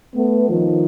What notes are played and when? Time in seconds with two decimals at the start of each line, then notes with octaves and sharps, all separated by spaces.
0.14 A3 B3
0.49 D#3 F3